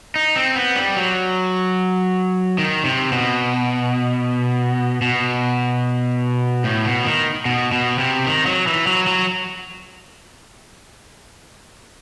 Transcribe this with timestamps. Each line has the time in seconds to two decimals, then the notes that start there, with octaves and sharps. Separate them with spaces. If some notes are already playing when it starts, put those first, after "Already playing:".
0.16 D#4
0.36 C4
0.56 B3
0.75 G3
0.97 F#3
2.58 D#3
2.85 C3
3.12 B2
5.02 B2
6.64 A2
6.84 B2
7.05 D#3
7.45 B2
7.72 B2
7.99 C3
8.26 D#3
8.46 F#3
8.67 E3
8.87 F#3
9.07 F#3